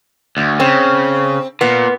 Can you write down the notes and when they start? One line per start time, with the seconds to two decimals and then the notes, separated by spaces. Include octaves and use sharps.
0.37 D2
0.60 C#3 C4
1.61 A#2 B3